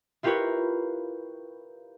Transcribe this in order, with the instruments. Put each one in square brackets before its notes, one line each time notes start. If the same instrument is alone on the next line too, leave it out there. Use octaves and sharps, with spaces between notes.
[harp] E4 F4 G4 A#4 B4 C#5